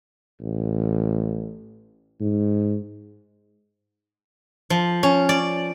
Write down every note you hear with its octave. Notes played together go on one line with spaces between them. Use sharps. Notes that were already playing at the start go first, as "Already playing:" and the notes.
A1
G#2
F3
C#4
D5